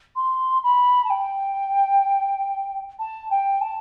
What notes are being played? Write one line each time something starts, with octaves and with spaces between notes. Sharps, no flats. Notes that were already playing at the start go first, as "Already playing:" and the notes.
C6
B5
A5
G5
A5
G5
A5